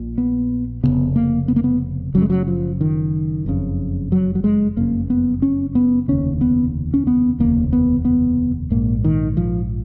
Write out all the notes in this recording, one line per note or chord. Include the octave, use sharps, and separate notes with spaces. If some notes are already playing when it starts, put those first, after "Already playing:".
Already playing: A#1 A#2
B3
F1 D#2 C#3 B3
A#3
B3
A#3
B3
F#1 F#2 C#3 F#3
G#3
F#3
F3
D#3
F#1 F2 C#3
F#3
F#3
G#3
F#1 F2 C#3 A#3
B3
C#4
B3
F1 D#2 C#3 C#4
B3
C#4
B3
F1 D#2 C#3 A#3
B3
B3
A#1 G#2 A#3
D#3
F3